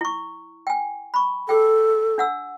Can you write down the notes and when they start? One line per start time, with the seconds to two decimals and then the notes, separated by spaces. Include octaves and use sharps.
0.01 E4 C#6
0.67 G5 G#5
1.14 B5 C#6
1.49 G#4 A4 G5
2.18 D4 F#5 E6